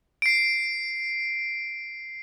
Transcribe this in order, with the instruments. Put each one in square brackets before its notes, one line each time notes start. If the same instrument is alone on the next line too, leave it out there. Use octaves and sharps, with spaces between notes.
[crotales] C7 D7